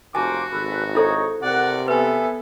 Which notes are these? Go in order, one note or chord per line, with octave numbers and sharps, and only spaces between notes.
F1 A#3 F#4 C5 G#5 A5 D6
G#1 A4 B4
D#4 E4 A4 C5 C#5
C3 A#4 D5 F#5
B3 A4 B4 E5 G#5